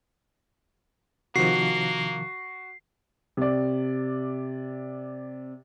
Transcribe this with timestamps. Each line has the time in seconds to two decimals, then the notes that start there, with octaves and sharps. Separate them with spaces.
1.36 C3 D#3 F3 A#3 F#4 C7
3.37 C3 D5